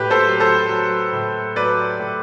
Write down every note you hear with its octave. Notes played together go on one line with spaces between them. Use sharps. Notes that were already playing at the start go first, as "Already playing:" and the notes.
Already playing: A2 G4 B4
A4 C5
F#3
A4 C5
F#3
A2
F#3 B4 D5
A2